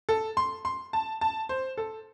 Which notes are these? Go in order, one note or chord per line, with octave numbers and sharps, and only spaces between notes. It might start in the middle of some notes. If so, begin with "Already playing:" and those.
A4
C6
C6
A5
A5
C5
A4